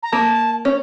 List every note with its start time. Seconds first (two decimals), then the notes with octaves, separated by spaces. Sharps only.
0.03 A#5
0.12 A#3 A5
0.65 C#4